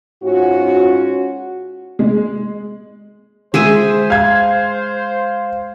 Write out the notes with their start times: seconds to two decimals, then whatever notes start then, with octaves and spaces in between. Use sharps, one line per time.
0.23 G#2 C#4 F4 F#4
1.99 G#3
3.54 G#3 G#4 C5 E5 G#5
4.10 F5 G#6